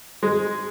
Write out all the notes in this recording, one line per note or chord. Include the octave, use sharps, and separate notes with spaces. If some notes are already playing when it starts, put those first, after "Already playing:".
G#3